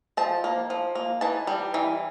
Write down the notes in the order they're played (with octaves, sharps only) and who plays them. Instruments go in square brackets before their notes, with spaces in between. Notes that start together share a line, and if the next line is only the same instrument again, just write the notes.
[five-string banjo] F3 A5
A#3
F3
A#3
E3 A5
G3
E3